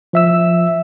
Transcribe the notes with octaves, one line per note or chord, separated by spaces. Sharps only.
F3 E5 E6